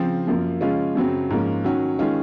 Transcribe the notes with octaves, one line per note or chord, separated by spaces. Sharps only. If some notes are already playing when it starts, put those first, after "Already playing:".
Already playing: C#3 F3 C4
F#2 F3 A#3
C#3 F3 G#3 C#4 F4
F#2 C#3 F#3 C4
G#2 F3 A#3 C#4
D#3 F#3 C#4 F#4
D#3 G#3 C#4 F4